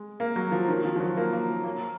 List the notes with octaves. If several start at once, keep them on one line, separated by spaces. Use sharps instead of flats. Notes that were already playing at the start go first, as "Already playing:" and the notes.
Already playing: G#3
A#3
F#3
F3
D#3
F3
F3
F#3
A#3
A#3
A#3